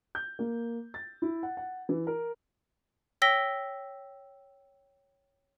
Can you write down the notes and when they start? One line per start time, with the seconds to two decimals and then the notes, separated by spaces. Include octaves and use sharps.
0.15 G6
0.39 A#3
0.94 A6
1.22 E4
1.43 F#5
1.57 F#5
1.89 E3
2.07 A#4
3.22 C#5 G5 E6 A#6 B6 G7